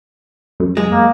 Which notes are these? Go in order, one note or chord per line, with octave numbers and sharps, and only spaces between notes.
F#2
G#3
A#3